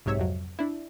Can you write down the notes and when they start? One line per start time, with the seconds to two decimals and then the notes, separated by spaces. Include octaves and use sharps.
0.06 B1 G#2 C3 C#5 E5
0.19 F2 F#3
0.59 D4 E4